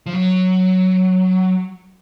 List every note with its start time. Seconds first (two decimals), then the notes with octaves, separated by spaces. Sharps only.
0.06 F3
0.13 F#3